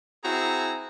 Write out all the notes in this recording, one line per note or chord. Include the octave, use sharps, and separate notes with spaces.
C4 E4 F#4 G#4 A#5